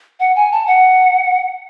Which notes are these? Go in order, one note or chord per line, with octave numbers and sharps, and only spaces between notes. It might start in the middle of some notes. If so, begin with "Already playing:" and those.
F#5
G#5
A5
F#5